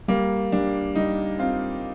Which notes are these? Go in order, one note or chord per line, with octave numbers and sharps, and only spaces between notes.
G3 A#3
G3 D4
G3 D#4
C4 F4